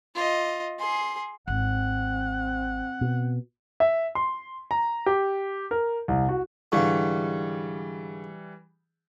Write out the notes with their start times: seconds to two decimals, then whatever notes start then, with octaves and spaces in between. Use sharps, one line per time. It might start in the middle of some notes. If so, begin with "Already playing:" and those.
0.15 F4 D#5
0.79 G#4 C6
1.48 G#1 C4 F#5
3.01 B2
3.80 E5
4.15 C6
4.71 A#5
5.06 G4
5.71 A#4
6.08 C2
6.29 F#4
6.72 G#2 D3 E3 G3 F5 C#6